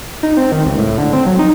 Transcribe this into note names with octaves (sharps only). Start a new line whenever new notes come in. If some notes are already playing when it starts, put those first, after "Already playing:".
D#4
C4
D#3
C#2
A2
D3
C4
F#3
D#4